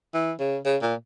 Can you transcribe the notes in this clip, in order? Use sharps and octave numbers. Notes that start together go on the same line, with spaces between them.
E3
C#3
C#3
A#2